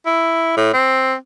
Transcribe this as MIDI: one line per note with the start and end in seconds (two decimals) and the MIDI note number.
0.06 0.56 64
0.57 0.72 45
0.74 1.14 60